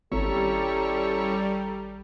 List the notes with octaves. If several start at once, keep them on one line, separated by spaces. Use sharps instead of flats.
G#1 G3 C#4 E4 A4 C#5 A#5